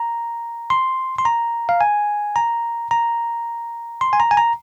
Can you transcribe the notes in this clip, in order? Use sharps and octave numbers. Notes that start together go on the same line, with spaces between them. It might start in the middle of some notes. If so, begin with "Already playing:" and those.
Already playing: A#5
C6
C6
A#5
F5
G#5
A#5
A#5
C6
G#5
A#5
G#5
A#5